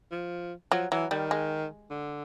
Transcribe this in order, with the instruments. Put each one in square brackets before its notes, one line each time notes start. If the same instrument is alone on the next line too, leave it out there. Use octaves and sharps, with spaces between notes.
[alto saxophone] F3
[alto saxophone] F3 [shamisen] F#3
[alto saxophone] E3 [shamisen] F#3
[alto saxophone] D#3 [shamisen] G3
[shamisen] G#3
[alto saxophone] D3